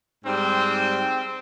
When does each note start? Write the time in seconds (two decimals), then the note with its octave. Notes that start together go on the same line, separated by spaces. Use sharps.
0.24 G#2 G3 C4